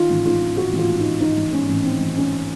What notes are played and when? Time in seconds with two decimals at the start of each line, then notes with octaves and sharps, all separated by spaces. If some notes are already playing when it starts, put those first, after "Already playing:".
Already playing: D#3 F4
0.10 A1
0.25 G#2 F4
0.41 A1
0.57 D#3 F#4
0.73 A1
0.78 F4
0.89 G#2
1.00 A1 D#4
1.21 D#3 D#4
1.37 A1
1.52 G#2 C#4
1.68 A1
1.84 D#3 C4
2.00 A1
2.16 G#2 C#4